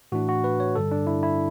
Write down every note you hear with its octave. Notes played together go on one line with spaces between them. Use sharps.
A2 E3 A3 D4 F#4
F#4
B4
C#5
G2 D3 G3 A4
D4
E4
E4